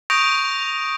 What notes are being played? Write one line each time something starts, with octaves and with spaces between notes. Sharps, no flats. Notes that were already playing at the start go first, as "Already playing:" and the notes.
C#6 D#6 G6 A#6 D7 F7